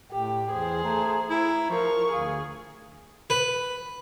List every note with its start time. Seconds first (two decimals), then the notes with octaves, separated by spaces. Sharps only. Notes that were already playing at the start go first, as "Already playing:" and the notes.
0.11 A2 G4 G5
0.51 E2 G#4 C5
0.84 A3 A#5
1.30 E4 A#5
1.70 F3 A#4 C#6
2.12 D2 G#4 F5
3.30 B4